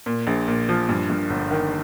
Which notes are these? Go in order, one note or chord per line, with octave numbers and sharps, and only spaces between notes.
A#2
A#1
A#2
F3
G2
G2
G1
D#3